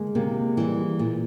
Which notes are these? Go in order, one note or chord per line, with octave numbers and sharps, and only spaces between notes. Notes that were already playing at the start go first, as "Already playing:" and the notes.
Already playing: G#3 A#3
C3 A#3
E3 G3
A#2